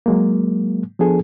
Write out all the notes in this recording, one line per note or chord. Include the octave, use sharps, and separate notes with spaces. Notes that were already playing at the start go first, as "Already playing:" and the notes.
F#3 G#3 A#3
F3 B3 D4 G#4 A4